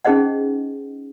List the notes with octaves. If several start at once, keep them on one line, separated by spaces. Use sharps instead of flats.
C#4 D#4 G#4 C5 D#5 F#5